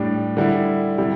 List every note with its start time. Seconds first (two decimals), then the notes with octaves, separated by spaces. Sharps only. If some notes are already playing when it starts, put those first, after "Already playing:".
Already playing: A2 G3 D4
0.37 D3 G3 E4
0.98 C3 G3 E4